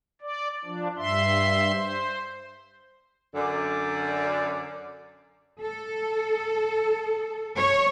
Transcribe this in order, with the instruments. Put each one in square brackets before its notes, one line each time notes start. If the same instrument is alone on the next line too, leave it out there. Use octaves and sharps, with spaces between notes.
[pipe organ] D5
F3 D4
G2 E5 C6
C5
[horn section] F#2 D3 D5
[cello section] A4
C#5